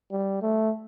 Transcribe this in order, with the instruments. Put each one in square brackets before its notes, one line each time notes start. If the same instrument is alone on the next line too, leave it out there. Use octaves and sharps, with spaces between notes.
[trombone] G3
A3